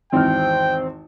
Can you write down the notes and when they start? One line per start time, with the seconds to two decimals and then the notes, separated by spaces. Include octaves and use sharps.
0.13 G#1 E2 C4 G5 F6